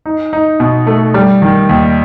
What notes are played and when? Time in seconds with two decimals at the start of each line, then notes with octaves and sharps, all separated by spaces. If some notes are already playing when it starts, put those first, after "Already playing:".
0.06 D#4
0.33 D#4
0.60 B2
0.87 A3
1.14 G3
1.42 D#3
1.69 D#2